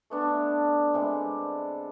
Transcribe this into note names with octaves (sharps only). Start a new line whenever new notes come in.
A3 B3 D4
C3 G3 G#3